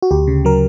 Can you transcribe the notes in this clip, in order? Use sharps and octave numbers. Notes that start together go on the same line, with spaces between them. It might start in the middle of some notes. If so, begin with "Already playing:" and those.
F#4
D2 G4
C#3
F#3 A#4